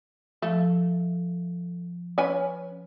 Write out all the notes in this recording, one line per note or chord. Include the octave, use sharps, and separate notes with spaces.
F3 A3
C#4 B4 G#5